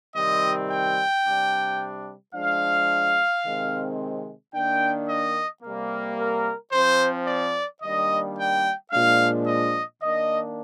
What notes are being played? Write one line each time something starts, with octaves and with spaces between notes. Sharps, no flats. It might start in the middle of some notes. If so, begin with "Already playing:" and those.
C3 D#3 G3 C4 D#5
G5
C3 G3 D4
F3 G#3 D4 F5
C3 D#3 G#3 C4
D#3 A#3 D4 G5
D#5
C3 G3 A#3
A#4
F3 C4 C5
D5
D#3 G3 A#3 D4 D#5
G5
A#2 F3 G#3 D4 F5
D#5
D#3 A#3 D4 D#5